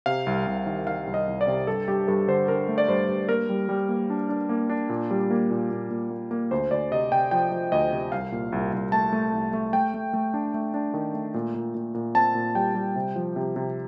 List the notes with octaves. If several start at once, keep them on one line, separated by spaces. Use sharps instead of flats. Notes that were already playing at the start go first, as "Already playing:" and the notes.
C3 F5
C2
C2
D#3
D#3 F5
C2
D#5
C2
D5
C3
G2 A4
G2 G4
G2 A4
D3 C5
D3 A#4
A3
D5
G2 C5
G2
A#3 A#4
G3
G3
A#3
D4
D4
A#3
D4
A#2
G3
A#3
A#2
A#2
A#2
A#3
A#3
D2 C5
D2 D5
C3 D#5
C3 G5
F3 G5
F3
D2 D#5
C3
C2 F5
A#2
C2
C2
A3 A5
A3
C2
A3
A3 G5
A3
A3
D4
A3
D4
D#3
A3
A#2
A#2
A#2
A#2
C4 A5
A#2
G3 G5
G3
C3
F3
C3
C3